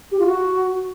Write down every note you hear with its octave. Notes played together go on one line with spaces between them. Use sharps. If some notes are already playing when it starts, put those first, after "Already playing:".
G4
F4
F#4